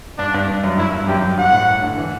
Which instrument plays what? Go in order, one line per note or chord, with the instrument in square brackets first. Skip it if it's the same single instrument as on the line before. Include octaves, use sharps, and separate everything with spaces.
[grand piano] G2 [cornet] D4
[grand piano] G2
G2
F#2
[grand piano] G2 [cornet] E4
[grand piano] G2
[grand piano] F#2 [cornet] G4
[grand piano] F#2
[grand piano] G2 [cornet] F#5
[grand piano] A2
D3
E3